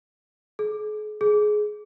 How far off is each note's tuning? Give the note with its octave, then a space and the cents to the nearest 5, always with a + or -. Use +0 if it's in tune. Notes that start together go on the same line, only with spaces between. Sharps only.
G#4 +40
G#4 +20